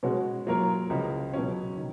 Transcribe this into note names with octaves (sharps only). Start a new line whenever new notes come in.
B2 G#3 C#4 F#4 C#5
F#3 A#3 F4 A#4 C#5
C#2 C#3 F3
B2 F#3 C#4
D#3